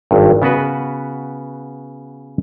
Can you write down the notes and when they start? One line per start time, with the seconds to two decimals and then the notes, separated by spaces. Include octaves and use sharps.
0.11 G#1 G2
0.42 C#3 B3 F#4 B4